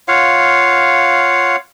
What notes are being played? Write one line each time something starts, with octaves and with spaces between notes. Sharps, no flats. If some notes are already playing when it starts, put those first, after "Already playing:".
F4 C#5 F5 F#5